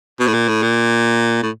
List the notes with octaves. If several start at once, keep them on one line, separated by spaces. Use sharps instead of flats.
B2
A2
A#2
A2
A#2
A2